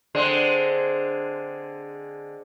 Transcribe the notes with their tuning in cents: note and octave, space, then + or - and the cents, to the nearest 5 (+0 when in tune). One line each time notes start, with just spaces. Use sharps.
D3 +0 G#3 +0 C4 +0